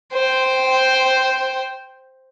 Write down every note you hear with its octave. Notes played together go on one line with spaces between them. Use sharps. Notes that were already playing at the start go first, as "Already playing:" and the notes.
C5 G5